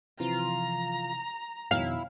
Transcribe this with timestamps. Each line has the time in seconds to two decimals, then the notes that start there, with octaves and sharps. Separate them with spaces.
0.20 C3 E3 F3 F4 A#5
1.71 F2 B2 D#3 E4 F5